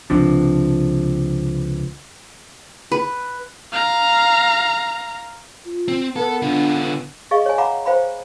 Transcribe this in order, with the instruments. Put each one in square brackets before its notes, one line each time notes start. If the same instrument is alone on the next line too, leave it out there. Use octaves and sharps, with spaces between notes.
[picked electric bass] C#2 C3 F3 D4
[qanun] B4
[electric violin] F5 A#5
[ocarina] F4
[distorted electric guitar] C4
[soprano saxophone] B3 [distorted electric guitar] A4 [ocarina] A#4
[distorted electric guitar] D3 F4 [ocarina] D4
[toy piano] G#4 D#5 F5 C#6
C#5 G#5
F5 F#5 A#5 B5 D6
C5 F5 G5 B5